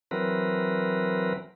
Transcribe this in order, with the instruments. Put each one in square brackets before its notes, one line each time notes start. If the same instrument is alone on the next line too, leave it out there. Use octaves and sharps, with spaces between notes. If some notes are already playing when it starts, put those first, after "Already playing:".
[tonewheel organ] E3 F#3 C4 A#4 B4